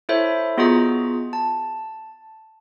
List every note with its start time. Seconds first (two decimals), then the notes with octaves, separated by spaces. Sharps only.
0.09 E4 A4 C5 C#5 E5
0.57 B3 F4 F#4 G#4 D#5 A#5
1.33 A5